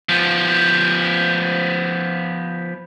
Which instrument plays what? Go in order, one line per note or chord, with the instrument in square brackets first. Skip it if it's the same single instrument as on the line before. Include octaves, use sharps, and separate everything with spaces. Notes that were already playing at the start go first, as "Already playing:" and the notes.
[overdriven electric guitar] F3 B3